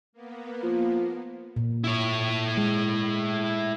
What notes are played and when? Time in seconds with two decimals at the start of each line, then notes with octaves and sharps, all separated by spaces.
0.13 A#3 B3
0.63 F3
1.56 A#2
1.84 E4 C#5
2.57 G#3